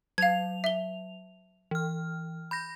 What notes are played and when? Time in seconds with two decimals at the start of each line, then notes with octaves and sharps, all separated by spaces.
0.18 F#3 F5 G#6 F7
0.64 E5 G7
1.71 E3 F6
2.51 B5 G6 A#6